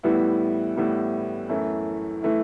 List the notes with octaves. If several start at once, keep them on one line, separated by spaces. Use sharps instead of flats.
A2 E3 G3 B3 E4
A2 E3 G3 B3 E4
F#2 E3 A3 E4
E3 A3 E4